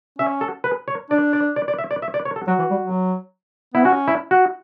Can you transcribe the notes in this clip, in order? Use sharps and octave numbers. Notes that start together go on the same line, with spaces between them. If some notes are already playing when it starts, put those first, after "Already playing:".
C#4 E5
A4
B4
C#5
D4 D5
D5
D5
D5
E5
D5
E5
D5
C#5
A4
F#3 F#4
E3
G3
F#3
B3 E4
C#4 F#4
E4
F#4